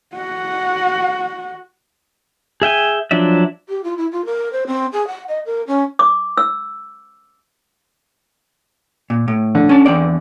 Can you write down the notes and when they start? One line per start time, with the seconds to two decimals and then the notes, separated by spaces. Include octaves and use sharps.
0.15 F#4 F#5
2.62 G#4 E5 G5 G#5
3.11 F3 F#3 D4 D5 E5
3.69 G4
3.84 F4
3.97 E4
4.12 F4
4.26 A#4
4.53 C5
4.67 C4
4.93 G#4
5.07 F#5
5.28 D#5
5.46 A#4
5.67 C#4
5.99 D6
6.37 E6
9.10 A#2
9.28 A2
9.55 D3
9.69 C#4 A5
9.86 E2 C4 D5